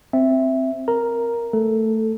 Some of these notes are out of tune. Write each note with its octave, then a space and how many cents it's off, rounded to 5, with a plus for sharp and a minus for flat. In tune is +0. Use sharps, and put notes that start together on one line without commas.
C4 +0 E5 +0
A#4 +0 A#5 +0
A3 +10 A4 +0